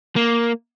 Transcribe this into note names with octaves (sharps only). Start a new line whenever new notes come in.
A#3